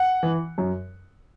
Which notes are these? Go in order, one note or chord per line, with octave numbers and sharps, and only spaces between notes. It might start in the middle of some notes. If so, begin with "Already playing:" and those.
Already playing: F#5
E3
F#2